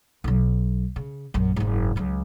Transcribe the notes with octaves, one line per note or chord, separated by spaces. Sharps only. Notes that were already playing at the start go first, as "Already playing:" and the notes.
B1 F#3
C#3
A#1 F#2
F#1 G#2
C#2 F#3